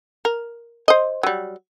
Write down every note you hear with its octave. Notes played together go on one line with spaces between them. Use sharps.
A#4
C5 D#5
F#3 G3